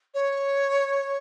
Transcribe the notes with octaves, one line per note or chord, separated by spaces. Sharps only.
C#5